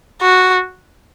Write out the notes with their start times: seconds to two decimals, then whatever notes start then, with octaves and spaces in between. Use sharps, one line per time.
0.22 F#4